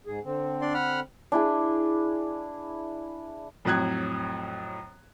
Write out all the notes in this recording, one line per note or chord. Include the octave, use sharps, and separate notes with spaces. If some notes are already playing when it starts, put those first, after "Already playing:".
G#2 G#4
D3 C4
D4 D5 C6
F#5 B5 F6
D4 E4 G#4
F2 A2 F#3 F#6 G#6